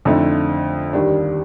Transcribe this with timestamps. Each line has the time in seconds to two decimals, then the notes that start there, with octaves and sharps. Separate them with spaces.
0.05 F2 D3 A3 D#4
0.93 D#2 D#3 G3 D4